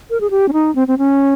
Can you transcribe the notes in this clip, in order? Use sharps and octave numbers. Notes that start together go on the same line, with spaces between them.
A#4
G#4
G4
C#4
D#4
C4
C4
C#4